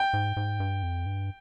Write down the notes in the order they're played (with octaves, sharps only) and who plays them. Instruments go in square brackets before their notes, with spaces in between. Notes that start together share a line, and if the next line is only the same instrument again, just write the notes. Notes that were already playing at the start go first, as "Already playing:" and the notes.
Already playing: [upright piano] G5
[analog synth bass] G#2
G#2
G2
F2
G2